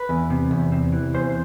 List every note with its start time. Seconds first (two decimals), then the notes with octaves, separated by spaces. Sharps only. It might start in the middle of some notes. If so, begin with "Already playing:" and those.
Already playing: B4
0.09 E2
0.30 C3
0.51 E2
0.72 C3
0.92 E3
1.14 E2 C5